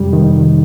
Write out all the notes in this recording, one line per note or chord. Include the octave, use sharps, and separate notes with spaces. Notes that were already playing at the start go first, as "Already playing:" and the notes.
Already playing: F2 C3 G3
D#3